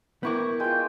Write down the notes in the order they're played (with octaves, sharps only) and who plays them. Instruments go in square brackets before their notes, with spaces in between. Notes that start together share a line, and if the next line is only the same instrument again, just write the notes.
[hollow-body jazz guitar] B3 E4 A#4 [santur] G5 C#6 D6
[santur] G#3 F4 [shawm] G5